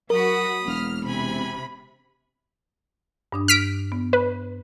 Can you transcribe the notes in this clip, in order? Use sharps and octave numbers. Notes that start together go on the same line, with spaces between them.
F#3 F#4 A#4 B5 D#6
E1 A#3 F6
C3 G#5 B5
G2 D4 D#6
F6 B6 D7
B3
B4